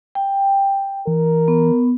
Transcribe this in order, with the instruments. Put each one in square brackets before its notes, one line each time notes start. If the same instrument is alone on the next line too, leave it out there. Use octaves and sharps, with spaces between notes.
[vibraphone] G5
[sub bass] E3 [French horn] A#4
[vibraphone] B3